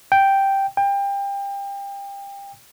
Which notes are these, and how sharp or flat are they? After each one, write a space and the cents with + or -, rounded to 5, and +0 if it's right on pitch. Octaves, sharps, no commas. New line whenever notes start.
G5 -5
G5 +25